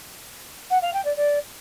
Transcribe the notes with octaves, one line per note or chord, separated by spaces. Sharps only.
F#5
F5
G5
D5
D5